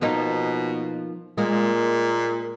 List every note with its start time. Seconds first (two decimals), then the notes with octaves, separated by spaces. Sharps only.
0.02 B2 F3 A#3 D#4
1.38 A#2 G#3 A#3